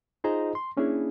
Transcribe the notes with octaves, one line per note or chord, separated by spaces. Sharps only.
D#4 F4 G#4 C5 D#5 A#5
C6
A#3 C#4 D4 E4 G#4